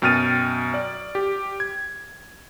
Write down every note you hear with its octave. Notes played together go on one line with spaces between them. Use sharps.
F#2 B2 G5 F6 A6 D#7
D5
G4
G#6